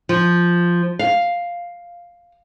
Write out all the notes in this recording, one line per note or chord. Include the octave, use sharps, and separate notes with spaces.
F3
F5